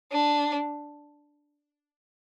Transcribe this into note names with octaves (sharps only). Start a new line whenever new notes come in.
D4